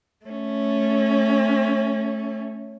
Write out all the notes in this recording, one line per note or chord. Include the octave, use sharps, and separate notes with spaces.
A3 C#4